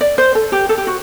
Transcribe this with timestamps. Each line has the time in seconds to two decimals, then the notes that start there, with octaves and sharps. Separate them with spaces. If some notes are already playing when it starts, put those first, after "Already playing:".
0.01 D5
0.18 C5
0.35 A4
0.52 G4
0.69 A4
0.78 G4
0.87 F#4